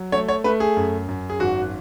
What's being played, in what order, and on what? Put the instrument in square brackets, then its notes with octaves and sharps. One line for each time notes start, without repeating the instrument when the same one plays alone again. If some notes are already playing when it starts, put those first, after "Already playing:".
Already playing: [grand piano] F#3
A3 C#5
C#5
A3 B4
G#4
F#2
F#2
G#4
G#1 F#4